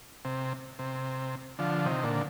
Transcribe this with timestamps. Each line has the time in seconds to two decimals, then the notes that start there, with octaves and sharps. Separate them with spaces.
0.25 C3
0.79 C3
1.59 D3 F3
1.85 C3 D#3
2.03 A#2 D3